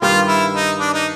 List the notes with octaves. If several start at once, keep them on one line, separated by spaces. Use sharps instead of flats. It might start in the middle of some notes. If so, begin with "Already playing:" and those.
G2 D#3 G3 F4
E4
D#4
D4
D#4